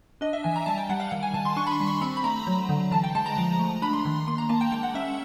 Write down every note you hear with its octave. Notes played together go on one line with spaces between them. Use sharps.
D4 D#5
E5
E3 G#5
A#5
G3 A5
G5
G3 F#5
F5
D#3 F#5
G#5
D#3 A5
C6
D4 C#6
B5
C6
G3
C6
C4 B5
B5
A3 A#5
F#3
D3
E3 A5
G5
G#3 A5
A#5
F3
A3
D4 B5
C6
D#3
A#3 C6
A#5
A#3 A5
G5
G#3 G5
F#5
C#4 E5